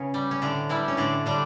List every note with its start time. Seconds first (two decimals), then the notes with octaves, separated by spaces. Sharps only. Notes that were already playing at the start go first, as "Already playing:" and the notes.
Already playing: C#3 C#4 B4
0.14 G3
0.31 C#4
0.42 A2 D3 D4
0.69 E3 G3 E4
0.88 C#4
0.97 A2 D3 D4
1.26 D3 G3 D4